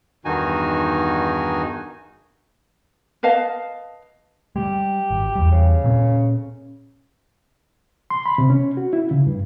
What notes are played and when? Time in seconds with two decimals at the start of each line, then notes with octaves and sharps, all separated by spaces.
0.25 E2 G2 D#3 D#4 F#4 G#5
3.23 B4 D#5 F5 A5
4.56 G3 G#3 G4
5.10 G#1
5.35 E2 G3
5.51 C#3
5.84 A#2 G#3 C#4
8.10 C6
8.26 B5
8.38 C3
8.50 C#4
8.77 F#4
8.93 E4
9.11 C#3
9.26 G2